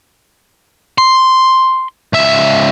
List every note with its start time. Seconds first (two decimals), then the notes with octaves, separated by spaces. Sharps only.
0.98 C6
2.13 C#2 E5